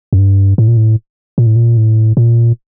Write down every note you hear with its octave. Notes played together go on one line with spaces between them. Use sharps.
F#2
G2
A2
A#2
A2
A#2
A2
A#2
A2
A#2